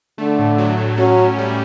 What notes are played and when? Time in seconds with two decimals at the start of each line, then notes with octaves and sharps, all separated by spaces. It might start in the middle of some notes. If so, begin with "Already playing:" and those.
0.18 D3 A3
0.39 A2
0.58 F#3
0.78 A2
0.98 F#3 C#4
1.18 A2
1.38 G3